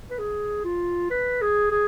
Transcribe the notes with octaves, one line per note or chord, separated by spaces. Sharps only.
B4
G#4
F4
B4
G#4
G#4